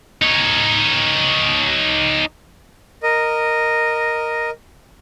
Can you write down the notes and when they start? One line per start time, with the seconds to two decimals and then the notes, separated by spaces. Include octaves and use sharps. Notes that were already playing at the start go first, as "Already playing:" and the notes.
0.22 D#4 C#5
3.03 A#4 D#5